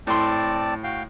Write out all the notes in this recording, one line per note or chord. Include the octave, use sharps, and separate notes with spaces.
A2 C4 D5 A5 C6
F#4 F5 G5